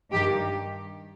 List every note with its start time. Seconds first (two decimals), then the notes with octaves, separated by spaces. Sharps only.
0.11 G2 D#3 G4